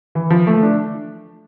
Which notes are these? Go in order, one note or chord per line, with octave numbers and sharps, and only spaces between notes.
E3
F3
A3
D4